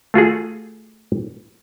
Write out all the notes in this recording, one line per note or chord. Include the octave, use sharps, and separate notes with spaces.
A3 F4 F#4 G#4